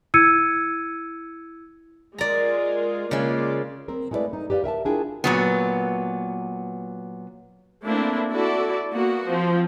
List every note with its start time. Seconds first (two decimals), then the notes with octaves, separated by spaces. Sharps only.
0.14 E4 E6 G#6 C#7 D#7
2.18 G#3 F4 A#4 D5 A#5
3.11 C#3 G#3 A#3 F4 D5
3.88 C4 A#4
4.11 G#3 A3 E4 F#4 B4 D5
4.33 D#4
4.50 G4 B4 D5 E5 F5
4.64 A#4 E5 G5 A5
4.85 D4 E4 F4 G#4 A#4 G5
5.24 A#2 F#3 B3
7.85 A3 A#3 C4 D4 E4
8.31 E4 F#4 A4 D5
8.93 A#3 B3 F#4
9.27 F3 C4